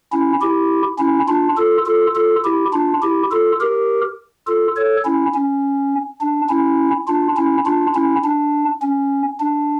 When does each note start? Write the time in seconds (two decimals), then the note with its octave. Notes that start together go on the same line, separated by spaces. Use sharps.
0.12 C#4 E4
0.42 E4 G4
0.99 C#4 E4
1.28 D4 F4
1.57 F4 A4
1.86 F4 A4
2.15 F4 A4
2.44 E4 G4
2.73 D4 F4
3.02 E4 G4
3.31 F4 A4
3.60 G4 A#4
4.47 F4 A4
4.76 A4 C#5
5.05 C#4 E4
5.34 C#4
6.21 D4
6.50 C#4 E4
7.08 D4 F4
7.37 C#4 E4
7.66 D4 F4
7.95 C#4 E4
8.24 D4
8.82 C#4
9.40 D4